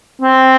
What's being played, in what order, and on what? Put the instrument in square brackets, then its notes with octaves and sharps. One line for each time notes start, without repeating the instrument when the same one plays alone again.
[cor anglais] C4